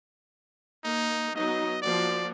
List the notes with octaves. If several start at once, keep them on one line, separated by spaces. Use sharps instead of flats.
A#3 D#4
F#3 B3 D#4 D#5
F3 A#3 F#4 D5